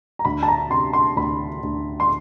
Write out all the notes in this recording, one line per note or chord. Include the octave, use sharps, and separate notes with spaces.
A#5
D2 B5
A5
A#5
C3 C6
C6
D2 B5
D2
C6